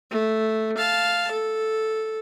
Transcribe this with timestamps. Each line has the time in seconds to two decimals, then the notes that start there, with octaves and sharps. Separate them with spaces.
0.11 A3
0.78 F5 A5
1.31 A4